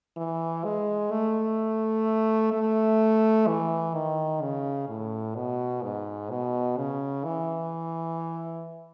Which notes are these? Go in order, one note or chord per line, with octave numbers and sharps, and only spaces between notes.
E3
G#3
A3
A3
E3
D#3
C#3
A2
B2
G#2
B2
C#3
E3